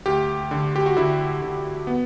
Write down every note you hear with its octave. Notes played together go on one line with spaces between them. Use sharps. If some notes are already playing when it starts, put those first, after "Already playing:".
D2 G4
D3
G4
F#4
D3 E4
D3
B3